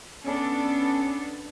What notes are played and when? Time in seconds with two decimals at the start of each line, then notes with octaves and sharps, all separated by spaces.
0.24 B3 C#4 D4 A4